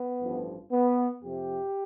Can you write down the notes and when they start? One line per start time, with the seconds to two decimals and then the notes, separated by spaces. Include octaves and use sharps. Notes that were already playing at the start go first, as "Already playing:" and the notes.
Already playing: B3
0.21 A1 G2 F3
0.72 B3
1.24 F2 C3 F3 G4